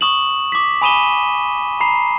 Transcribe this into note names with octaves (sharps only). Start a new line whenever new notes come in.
C#6 D#6 E7 F#7
D6 B6
G#5 B5 D#6 D#7 E7 G7
A#5 B5 C7